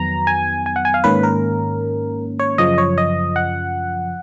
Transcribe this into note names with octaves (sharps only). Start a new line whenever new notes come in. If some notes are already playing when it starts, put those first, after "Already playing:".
Already playing: F2 D#3 F#3 B3 A#5
G#5
G#5
F#5
G#5
F5
G#2 D#3 A#3 C#4 B4
A#4
C#5
F#2 C#3 F3 D#5
C#5
D#5
F#5